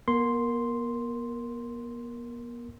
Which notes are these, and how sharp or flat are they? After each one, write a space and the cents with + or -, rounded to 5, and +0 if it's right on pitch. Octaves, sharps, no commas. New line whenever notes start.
B3 -45 A#4 +0 C6 +0